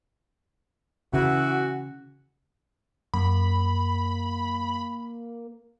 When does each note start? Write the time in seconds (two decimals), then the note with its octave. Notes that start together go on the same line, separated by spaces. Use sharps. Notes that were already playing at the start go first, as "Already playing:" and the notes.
1.14 C#3 E3 F#4
3.14 F#2 A#3 B5